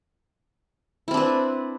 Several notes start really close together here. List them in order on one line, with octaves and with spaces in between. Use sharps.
E4 C4 D4 B4